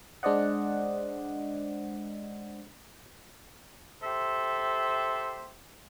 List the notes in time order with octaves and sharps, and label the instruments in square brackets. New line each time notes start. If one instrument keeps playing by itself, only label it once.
[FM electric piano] G#3 D4 C5 D5 D#5 F#5
[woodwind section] G4 A4 C5 E5